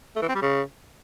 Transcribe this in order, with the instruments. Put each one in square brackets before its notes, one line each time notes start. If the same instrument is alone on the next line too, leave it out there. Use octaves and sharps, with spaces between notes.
[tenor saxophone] A3
E3
C4
G3
C#3